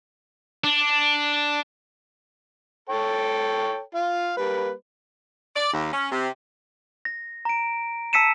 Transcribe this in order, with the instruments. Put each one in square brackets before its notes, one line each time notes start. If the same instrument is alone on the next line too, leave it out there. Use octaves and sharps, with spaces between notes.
[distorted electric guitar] D4
[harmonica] A4 C#5 G5
F4 F5
G3 A#3 B4
[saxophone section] D5
D#2
C#4
C3
[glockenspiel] A#6
A#5 D7
A5 E6 B6 C#7 D#7 E7